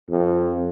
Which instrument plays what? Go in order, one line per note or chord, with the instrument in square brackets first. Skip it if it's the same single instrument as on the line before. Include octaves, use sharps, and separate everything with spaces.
[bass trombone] F2